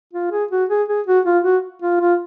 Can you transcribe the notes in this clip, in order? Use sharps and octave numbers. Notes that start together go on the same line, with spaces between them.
F4
G#4
F#4
G#4
G#4
F#4
F4
F#4
F4
F4